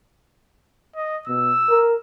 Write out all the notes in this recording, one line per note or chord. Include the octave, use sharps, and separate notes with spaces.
D#5
B2 E6
A#4